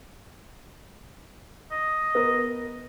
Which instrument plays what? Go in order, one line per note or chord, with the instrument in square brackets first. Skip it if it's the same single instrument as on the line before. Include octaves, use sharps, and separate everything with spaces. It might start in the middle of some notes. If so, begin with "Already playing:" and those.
[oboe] D#5
[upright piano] B3 A#4